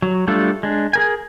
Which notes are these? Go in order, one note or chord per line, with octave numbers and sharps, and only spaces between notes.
F#3
G3 A3 D4 F4 A4
G#3 D4
G#4 A#4 G#5